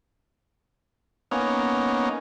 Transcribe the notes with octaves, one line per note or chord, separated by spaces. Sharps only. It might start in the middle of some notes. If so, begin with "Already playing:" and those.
A#3 B3 C#4 D#4